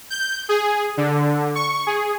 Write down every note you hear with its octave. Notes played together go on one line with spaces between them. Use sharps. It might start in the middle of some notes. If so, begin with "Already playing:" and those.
G6
G#4
D3
C#6
G#4